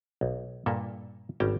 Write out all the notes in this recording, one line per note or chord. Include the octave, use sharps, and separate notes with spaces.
B1
G2 A#2 A#3 A4 E5
G#1 G3 C#4 G5 A5 A#5